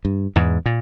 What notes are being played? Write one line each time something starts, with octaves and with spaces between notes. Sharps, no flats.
G2
E2 G#2
A#2